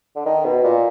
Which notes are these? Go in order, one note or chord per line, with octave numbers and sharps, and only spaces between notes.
D3
D#3
B2
A#2